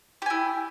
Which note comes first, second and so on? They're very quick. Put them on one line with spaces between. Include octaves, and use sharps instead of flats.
G4 G#5 E4